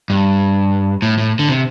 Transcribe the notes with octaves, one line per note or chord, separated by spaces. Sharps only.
G2
A2
A2
D3
C3